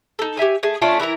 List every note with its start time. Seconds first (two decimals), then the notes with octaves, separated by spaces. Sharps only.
0.19 D#4 A4
0.37 G4 C#5 E5 G#5
0.63 A3 G#4
0.82 A3 C#4 D4 F4
1.00 E3 E4 A#4 A#5